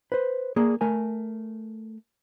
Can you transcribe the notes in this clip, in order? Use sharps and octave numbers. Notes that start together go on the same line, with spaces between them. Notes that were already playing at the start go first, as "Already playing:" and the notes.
B4 C5
A#3 G#4 D5
A3 A#4 G#5